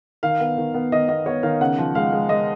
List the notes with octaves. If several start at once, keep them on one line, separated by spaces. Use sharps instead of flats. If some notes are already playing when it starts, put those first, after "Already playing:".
D#3 F5
B3
D#3
B3
D#3 D#5
B3 D#5
B3 C#5
D#3 F5
C#3 F#5
F3
G#3 F5
G#3
G#3 D#5